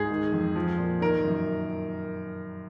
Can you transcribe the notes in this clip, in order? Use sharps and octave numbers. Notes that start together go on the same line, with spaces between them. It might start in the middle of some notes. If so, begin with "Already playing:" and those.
Already playing: G#2 G#4
D#3
F2
F3
A#2
D#3 A#4
F#2